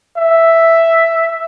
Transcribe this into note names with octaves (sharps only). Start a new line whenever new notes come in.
E5